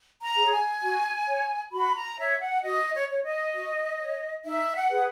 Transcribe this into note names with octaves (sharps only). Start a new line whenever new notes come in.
A#5
G#4 C#5
G#5
F#4
C#5
F#4 B5
A#5
C#5 E5
F#5
F#4 D#5
C#5
C#5
D#5
F#4
C#5
D#4 E5
F#5
G#4 B4